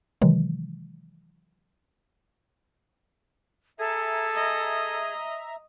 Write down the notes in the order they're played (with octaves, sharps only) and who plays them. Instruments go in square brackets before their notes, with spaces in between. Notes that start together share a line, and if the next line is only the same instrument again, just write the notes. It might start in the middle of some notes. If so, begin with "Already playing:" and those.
[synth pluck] C3 D#3 E3 F#3 G#3
[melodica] G#4 G#5 [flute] A4 [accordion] E5 A#5
[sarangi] D#5